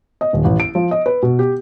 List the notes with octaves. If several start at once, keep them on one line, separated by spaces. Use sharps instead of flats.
D#5
D#1
A1
D7
F3
D#5
B4
B2
G4